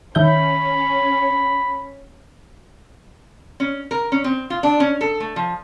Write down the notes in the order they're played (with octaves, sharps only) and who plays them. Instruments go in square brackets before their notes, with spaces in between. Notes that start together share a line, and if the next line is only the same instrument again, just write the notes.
[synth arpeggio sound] D#3 E5 G6 [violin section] C#4 [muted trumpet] B5
[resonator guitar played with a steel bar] C#4
A#4
C#4
C4
F4
D4
C#4
A4
A3
F3